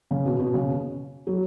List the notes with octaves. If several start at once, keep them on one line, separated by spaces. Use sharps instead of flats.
C#3
B2
B2
C#3
F#3